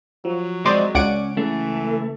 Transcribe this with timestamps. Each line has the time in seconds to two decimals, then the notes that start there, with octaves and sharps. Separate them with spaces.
0.25 F3 F#3
0.65 G#3 C4 C5 D5 D#5
0.95 C#2 C#4 D5 F#5 D7
1.37 C#3 E3 A3